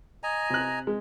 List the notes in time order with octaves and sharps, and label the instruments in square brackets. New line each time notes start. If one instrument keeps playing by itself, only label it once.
[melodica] D#5 G#5 A#5
[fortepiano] C3 F#6
G#3